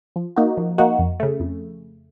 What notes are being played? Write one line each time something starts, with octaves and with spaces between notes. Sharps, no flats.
F3
A#3 D#4 F#4
F3
A#3 D#4 F#4
F2
C#3 A3
F2